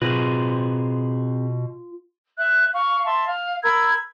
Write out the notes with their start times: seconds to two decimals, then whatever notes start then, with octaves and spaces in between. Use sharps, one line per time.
0.02 B2 C4 F4 G#4 B4
2.37 E5 F#6
2.74 F5 C#6
3.06 E5 A5 C6
3.26 F5
3.63 A#4 B5 E6 G#6